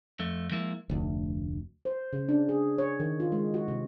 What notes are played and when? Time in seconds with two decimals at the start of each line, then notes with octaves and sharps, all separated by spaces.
0.20 F2 A3
0.51 F3 G#3 A#3 E4
0.90 F1 D2
1.85 C5
2.13 C#3
2.29 D4
2.49 G#4
2.78 C#5
3.00 D#3
3.20 F4
3.32 G#3
3.54 F#4
3.68 C3